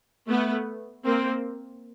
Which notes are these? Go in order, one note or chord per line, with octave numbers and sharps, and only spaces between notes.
A3 B3
A#3 C4